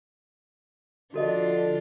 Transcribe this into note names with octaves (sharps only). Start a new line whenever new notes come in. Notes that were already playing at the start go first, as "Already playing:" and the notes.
D3 F3 D4 F4 F#4 A4 D#5